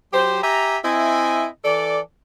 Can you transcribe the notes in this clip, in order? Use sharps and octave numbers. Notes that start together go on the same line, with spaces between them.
F#3 G4 C5
G4 E5 G#5 A#5
C4 E4 D#5 E5 G#5
E3 A4 D5